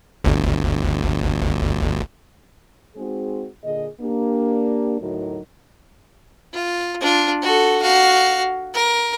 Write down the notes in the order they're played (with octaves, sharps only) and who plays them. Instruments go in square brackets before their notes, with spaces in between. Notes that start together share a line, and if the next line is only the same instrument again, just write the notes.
[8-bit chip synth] G1 D2
[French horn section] G#3 C4 D#4 F#4 G#4
A#2 D3 G#4 D#5
A#3 D4 G4
D2 A2 F#3 D#4 F#4 A#4
[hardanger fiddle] F4
D4 F4
F#4 A4
F#4 F5
A#4